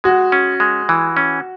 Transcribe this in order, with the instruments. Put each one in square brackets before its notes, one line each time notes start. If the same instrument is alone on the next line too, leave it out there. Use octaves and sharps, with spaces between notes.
[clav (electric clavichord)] G#3 [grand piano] F#4
[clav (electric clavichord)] C#4
G#3
E3
C#4